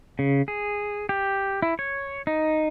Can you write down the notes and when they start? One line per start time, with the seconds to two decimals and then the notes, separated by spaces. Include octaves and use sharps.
0.19 C#3
0.48 G#4
1.09 G4
1.62 E4
1.79 C#5
2.27 D#4